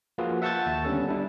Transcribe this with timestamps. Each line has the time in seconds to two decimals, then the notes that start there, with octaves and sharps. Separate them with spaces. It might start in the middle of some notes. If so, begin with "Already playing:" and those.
0.18 F3 A#3 F4 F#4 G#4 B4
0.42 E5 F#5 A5 C#6 G6 A6
0.66 D#2 A5
0.85 D3 G3 B3 C#4 A4
1.08 G3 D4 E4